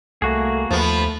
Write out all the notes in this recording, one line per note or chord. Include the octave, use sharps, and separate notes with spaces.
C2 A3 A#3 F#4 G#4
D#2 F3 A3 B3